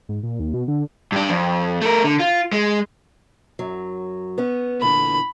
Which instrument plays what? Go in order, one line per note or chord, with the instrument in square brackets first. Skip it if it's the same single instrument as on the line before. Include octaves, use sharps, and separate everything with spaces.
[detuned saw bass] G#2
A#2
D#2
B2
D3
[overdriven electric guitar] G2 D4
F2
A3 A#4
D3
F4
G#3
[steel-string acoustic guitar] F#2 F#3
B3 C#4
[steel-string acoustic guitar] E2 A#2 D3 [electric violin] B5